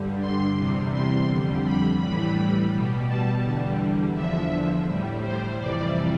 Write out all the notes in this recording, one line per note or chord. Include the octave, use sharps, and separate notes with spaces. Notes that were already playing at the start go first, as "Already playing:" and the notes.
Already playing: G2 D3 G3
C6
E2 C3 G3
C6
F2 D3 G3
B5
A2 E3 G3 B5
B2 G3
A5
E2 D3 G3
E2 D3 F3 E5
A2 G3
C5
F2 C3 E3 G3 D5